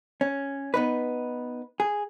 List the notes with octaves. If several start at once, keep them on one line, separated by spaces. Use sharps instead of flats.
C#4
B3 D#4 B4
G#4